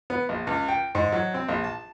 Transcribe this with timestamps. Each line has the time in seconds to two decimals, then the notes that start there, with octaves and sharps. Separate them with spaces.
0.10 B3
0.29 A#1
0.47 C#2
0.68 G5
0.95 G#2
1.12 F#3
1.34 C4
1.48 A#1
1.64 A5